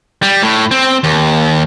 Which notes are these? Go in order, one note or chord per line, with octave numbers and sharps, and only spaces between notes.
G3
A2
C4
D#2